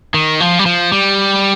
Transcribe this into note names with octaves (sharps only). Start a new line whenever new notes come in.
D#3
F3
G3
F3
G3